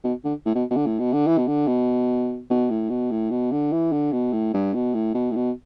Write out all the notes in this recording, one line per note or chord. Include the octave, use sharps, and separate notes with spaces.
B2
D3
A2
B2
B2
D3
A2
B2
D3
E3
B2
D3
B2
B2
A2
B2
A2
B2
D3
E3
D3
B2
A2
G2
B2
A2
B2
A2
B2